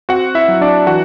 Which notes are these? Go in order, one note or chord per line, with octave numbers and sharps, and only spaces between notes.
C4 F#4 F#5
E4 E5
F#3
D4 D5
E3 F#4 F#5